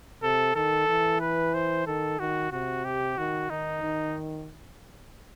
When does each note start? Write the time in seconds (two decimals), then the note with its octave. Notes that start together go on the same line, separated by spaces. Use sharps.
0.23 C3 A4
0.56 D#3 A4
0.89 E3
1.21 B4
1.54 C5
1.87 D#3 A4
2.19 D#3 F#4
2.52 C3 F#4
2.85 G4
3.18 D#3 F#4
3.50 D#3 D#4
3.83 D#3